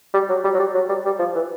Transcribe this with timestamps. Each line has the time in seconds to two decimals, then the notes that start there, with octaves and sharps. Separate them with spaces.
0.14 G3
0.29 F#3
0.44 G3
0.54 F#3
0.59 G3
0.74 F#3
0.89 G3
1.05 G3
1.19 F3
1.35 E3